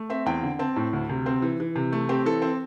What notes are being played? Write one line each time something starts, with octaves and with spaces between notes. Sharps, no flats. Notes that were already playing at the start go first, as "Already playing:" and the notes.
Already playing: A3
C4 E5
E2 G5
D3
C4 A5
A2
D2
C3
C4
E3
E3
C3
A3
C4 G4
E3 A4
C4